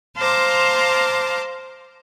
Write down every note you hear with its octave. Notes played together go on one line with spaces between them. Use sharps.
C5 F5 A5 A#5 C6 D6